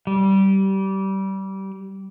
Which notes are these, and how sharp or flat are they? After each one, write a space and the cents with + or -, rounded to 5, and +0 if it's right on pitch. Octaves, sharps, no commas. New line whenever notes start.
G3 -20